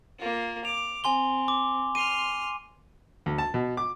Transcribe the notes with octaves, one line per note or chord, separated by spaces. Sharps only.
A#3 F4
D6 F7
C4 G#5 C6 G7
D6
C6 F6 D#7
D2
A5
B2
D6